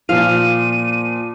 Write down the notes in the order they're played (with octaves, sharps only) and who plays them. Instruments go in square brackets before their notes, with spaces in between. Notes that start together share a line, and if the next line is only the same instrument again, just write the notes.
[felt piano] A#2 F3 [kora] F5 [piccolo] D#7